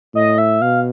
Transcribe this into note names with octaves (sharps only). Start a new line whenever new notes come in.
A2 D#5
E5
B2 F5